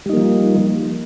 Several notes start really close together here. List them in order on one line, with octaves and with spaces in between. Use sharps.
G3 D#4 A#3 F3